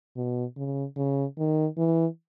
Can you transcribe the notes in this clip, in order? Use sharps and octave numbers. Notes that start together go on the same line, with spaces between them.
B2
C#3
C#3
D#3
E3